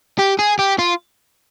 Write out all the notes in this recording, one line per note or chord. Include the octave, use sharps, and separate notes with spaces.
G4
G#4
G4
F4